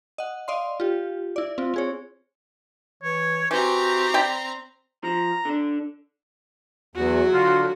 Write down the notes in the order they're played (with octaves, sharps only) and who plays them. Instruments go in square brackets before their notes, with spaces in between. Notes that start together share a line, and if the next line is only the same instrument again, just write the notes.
[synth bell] D#5 F#5
D5 D#5 F5 C6
F4 G4
E4 D5
C4 F4
C4 G#4 C#5
[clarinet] E3 [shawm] C#5
[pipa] E3 [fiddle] C4 A#5 [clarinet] F#4 [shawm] G4
[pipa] D5 G5 B5
[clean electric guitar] F3 [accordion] A#5
[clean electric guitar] D3 D4
[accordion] E2 [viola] F#3 F#4
[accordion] D3 [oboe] F4